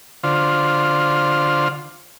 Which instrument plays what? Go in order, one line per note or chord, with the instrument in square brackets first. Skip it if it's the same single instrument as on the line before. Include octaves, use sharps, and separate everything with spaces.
[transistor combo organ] D3 F4 C5